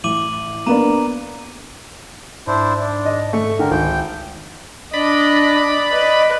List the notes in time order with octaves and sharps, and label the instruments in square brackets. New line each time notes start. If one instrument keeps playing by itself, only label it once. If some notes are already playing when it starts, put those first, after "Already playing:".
[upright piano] A1 [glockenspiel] D6 D#7 F#7
[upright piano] A#3 B3 D4 [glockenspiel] A#5 D#7
[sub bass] G#2 [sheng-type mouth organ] D4 E4 C5
[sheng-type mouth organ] D4
[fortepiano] D#5
[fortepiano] A3 [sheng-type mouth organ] C#6
[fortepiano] D3 G5 [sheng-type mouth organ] A#4
[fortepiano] G#1 [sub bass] C#2 [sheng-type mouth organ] G5
[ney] D4 [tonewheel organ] D5 B5 [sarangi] D#5
[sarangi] B4 [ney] D#5